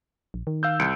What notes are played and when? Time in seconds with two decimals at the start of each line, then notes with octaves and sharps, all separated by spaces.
0.34 A#1
0.47 D#3
0.63 F5 E6 G6
0.79 C2 C#7 D7